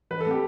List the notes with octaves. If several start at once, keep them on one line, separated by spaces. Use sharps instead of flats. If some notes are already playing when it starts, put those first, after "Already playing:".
E3 B4
A4
A3 C4 G4